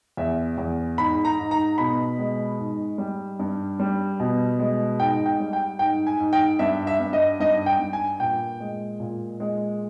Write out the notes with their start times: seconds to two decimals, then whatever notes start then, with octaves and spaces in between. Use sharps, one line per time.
0.17 E2 E5
0.58 E2
0.98 G#2 B5
1.25 A#5
1.39 G#2
1.51 A#5
1.78 B2 B5
2.19 G#3
2.59 G#2
2.98 G3
3.39 G2
3.80 G3
4.20 B2
4.59 G#3
5.00 G#2 G5
5.26 G5
5.40 G3
5.53 G5
5.79 G#2 G5
6.07 G#5
6.20 G#2
6.33 G5
6.59 G2 E5
6.87 E5
7.00 G2
7.13 D#5
7.40 G2 D#5
7.66 G5
7.80 G2
7.93 G#5
8.20 A#2 G5
8.60 G#3
9.00 A#2
9.40 G#3